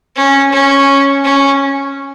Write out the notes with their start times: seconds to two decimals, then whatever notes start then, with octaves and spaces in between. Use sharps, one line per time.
0.16 C#4
0.52 C#4
1.24 C#4